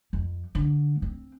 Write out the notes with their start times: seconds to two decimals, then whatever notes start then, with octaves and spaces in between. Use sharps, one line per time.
0.13 F2
0.55 D3
1.02 C4